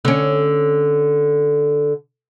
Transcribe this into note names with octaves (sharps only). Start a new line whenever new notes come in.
D3 C#4